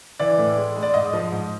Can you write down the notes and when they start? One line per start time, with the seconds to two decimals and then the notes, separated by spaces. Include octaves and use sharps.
0.20 E3 D5
0.38 A2
0.57 G#3
0.76 G#3
0.83 D5
0.94 G#2 D#5
1.13 F3
1.32 G#2